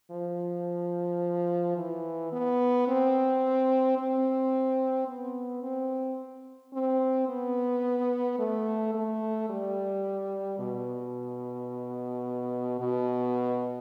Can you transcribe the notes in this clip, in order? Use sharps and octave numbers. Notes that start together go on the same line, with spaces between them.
F3
E3
B3
C4
C4
B3
C4
C4
B3
A3
A3
G3
B2
B2